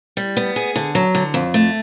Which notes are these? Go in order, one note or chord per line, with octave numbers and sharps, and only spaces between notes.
G3
B3
G#4
D3
F#3
D3
F2
A3